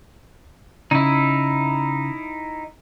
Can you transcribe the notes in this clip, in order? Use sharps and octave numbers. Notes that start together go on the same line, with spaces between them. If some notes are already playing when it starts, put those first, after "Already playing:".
C#3 D#4 E4